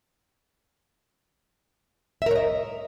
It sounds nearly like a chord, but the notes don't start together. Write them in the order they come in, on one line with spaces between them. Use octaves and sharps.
E5 A#4 C#5 D#5